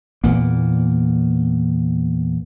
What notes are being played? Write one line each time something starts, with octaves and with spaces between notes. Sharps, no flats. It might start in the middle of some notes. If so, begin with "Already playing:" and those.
E2 A#2 A#3 B3